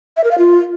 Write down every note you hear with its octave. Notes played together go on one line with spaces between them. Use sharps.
E5
A#4
F5
F4